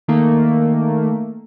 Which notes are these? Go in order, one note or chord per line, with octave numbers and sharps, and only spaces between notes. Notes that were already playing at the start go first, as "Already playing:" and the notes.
D#3 A3 A#3